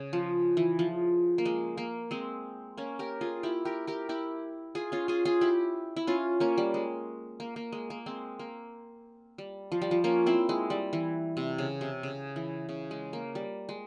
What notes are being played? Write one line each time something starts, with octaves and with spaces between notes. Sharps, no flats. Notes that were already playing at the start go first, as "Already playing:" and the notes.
Already playing: C#3
F3
E3
F3
A#3
G#3
A#3
G#3 C4
A#3 C#4
G4 A#4
F4 G#4
E4 G4
G4 A#4
G4 A#4
E4 G4
F4 G#4
C#4 F4
F4 G#4
F4 G#4
E4 G4
E4
C#4 F4
A#3 C#4
G3
G#3
A#3
A#3
G#3
A#3
G#3 C4
A#3
G3
F3
G3
F3
A#3 C#4
C4 E4
G#3
G3
E3
C3
C#3
C3
C#3
E3
C#3
G#3
A#3
G3
G#3